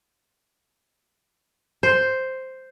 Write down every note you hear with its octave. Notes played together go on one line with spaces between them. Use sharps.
C5